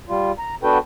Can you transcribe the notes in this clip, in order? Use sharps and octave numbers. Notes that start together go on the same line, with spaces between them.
G3 F4
A#5
B3 D4 F#4 A4 B4 G5